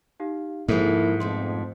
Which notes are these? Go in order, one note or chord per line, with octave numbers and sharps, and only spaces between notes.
D#4 G4 F5
G#2 F3 G#3 A#3 E4 A4
F2 B2 F3 A3 C6